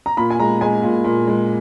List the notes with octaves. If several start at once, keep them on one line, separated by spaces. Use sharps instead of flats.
A#5
A#2 B5
G#5
G#3 A#5
G#3 G#5
A#2
A#2
G#3